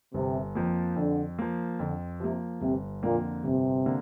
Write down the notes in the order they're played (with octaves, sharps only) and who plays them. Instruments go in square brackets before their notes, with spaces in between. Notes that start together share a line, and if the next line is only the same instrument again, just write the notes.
[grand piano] G1 [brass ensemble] C3
[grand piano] F2 F3 A#3
[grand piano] F2 [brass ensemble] D3
[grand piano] F3 A#3
[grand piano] F2 [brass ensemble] D3
[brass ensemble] C3 [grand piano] F3 A#3
[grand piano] G1 [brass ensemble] C3
[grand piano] F2 D3 A#3 [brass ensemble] A#2
[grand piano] G1 [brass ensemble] C3
[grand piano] D3 A#3